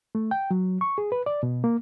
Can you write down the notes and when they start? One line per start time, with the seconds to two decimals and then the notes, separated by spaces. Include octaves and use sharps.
0.15 A3
0.31 G5
0.51 F#3
0.81 C#6
0.98 G#4
1.12 B4
1.26 D5
1.43 B2
1.64 A#3